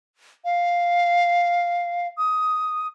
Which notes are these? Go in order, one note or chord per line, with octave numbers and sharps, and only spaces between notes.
F5
D#6